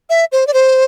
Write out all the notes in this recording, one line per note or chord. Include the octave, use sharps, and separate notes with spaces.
E5
C5
D5
C5